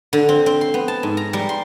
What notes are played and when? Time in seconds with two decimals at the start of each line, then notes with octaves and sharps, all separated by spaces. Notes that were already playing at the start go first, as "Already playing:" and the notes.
0.13 D3
0.29 C4
0.46 C4
0.61 C6
0.74 B3
0.88 A5
1.03 G#2
1.17 A#5
1.33 G3
1.49 C6